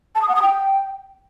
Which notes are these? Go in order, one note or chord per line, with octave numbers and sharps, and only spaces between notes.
A5
D#6
F#5
D#6
G5